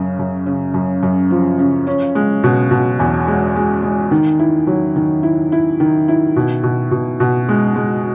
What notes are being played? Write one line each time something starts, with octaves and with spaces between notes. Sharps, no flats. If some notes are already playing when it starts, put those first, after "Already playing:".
Already playing: F#2 C#3
F#2
C#3
F#2
F#2
F3
C#3
C#4
G#3
B2
B2
E2
G#3
G#3
G#3
D#3
E4
F#3
D#3
E4
E4
D#3
E4
B2
B2
B2
B2
G#3
G#3